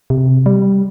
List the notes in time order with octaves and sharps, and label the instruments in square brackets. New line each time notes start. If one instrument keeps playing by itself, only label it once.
[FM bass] C3
G3